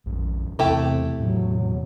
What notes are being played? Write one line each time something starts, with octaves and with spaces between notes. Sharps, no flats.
A#1 F2 G#2
E2 C3 A3 C4 E4 G4
D#1 E2 A2 C3 F#3